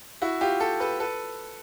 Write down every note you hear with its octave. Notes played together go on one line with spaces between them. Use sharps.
E4 F#4
F4 G4
G4 A4
A4 B4
A4 B4